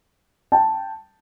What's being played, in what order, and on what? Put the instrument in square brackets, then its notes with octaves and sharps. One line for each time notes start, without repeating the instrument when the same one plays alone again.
[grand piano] G5 A5